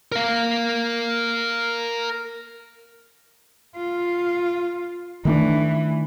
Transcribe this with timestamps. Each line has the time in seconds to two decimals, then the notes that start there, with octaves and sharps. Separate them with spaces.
0.12 A#4 F5
3.76 F4
5.25 D#3 E3 A3 D4